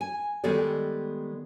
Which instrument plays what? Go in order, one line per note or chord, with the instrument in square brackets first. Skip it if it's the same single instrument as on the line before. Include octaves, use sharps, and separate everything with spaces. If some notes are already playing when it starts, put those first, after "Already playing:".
[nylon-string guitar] G#5
D#3 G3 G#3 B3 A4 D5